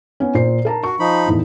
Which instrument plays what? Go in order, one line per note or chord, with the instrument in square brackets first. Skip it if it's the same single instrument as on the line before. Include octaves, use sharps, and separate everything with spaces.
[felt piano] B3 C#4
A#2 C5 C7
A#4 A5 A#5
[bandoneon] F#4 [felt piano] C#6
[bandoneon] F3 D#4 B5
[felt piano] E2 A2 D#3